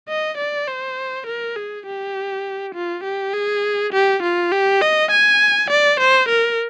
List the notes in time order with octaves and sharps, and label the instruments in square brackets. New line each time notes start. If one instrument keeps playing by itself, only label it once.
[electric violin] D#5
D5
C5
A#4
G#4
G4
F4
G4
G#4
G4
F4
G4
D#5
G#5
D5
C5
A#4